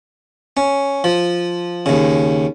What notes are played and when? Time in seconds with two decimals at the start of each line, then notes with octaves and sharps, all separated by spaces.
0.57 C#4
1.04 F3
1.86 D#2 C#3